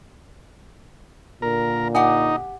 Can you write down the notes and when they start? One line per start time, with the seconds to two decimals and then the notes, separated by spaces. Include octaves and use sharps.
1.42 A#2 D3 A#4
1.95 D#4 G4 F#5 G#5